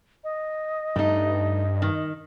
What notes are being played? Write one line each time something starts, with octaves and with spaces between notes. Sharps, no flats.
D#5
G2 A3 D#4
D#3